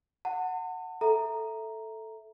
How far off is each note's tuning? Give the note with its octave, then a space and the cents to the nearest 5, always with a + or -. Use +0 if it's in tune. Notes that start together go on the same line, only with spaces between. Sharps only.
F#5 +0 A5 +40
A4 +0 E5 -5 A#5 +0